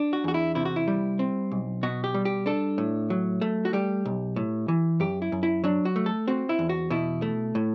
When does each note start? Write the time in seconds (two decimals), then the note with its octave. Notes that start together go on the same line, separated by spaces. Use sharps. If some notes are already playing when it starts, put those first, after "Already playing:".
Already playing: D4
0.13 F#4
0.24 E2 F#4
0.34 E4
0.55 C3 E4
0.65 F#4
0.76 E4
0.88 G3
1.19 C4
1.52 B1
1.83 B2 F#4
2.04 G4
2.14 G3
2.25 G4
2.46 D4 A4
2.78 A2
3.10 F#3
3.41 A3
3.65 F#4
3.73 G3 G4
4.05 B1
4.36 A2
4.68 E3
5.00 F#2 G4
5.22 E4
5.32 F#2
5.43 E4
5.64 F#3 D4
5.85 F#4
5.96 A3
6.06 A4
6.28 C4 F#4
6.49 E4
6.59 E2
6.69 F#4
6.90 B2 E4
7.22 A3
7.55 A2